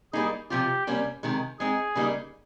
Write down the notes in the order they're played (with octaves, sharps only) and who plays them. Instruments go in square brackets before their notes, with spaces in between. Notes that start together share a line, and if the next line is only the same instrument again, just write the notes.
[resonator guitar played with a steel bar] G3 A#3 D#4 [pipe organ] G#4
[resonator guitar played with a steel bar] C3 F3 C4 F4 [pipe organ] G4
[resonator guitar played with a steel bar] C3 G3 A#3 C#4
C3 D#3 G#3
[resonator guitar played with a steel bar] G#3 C4 D#4 [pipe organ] G#4
[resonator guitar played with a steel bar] C#3 G3 A#3 D#4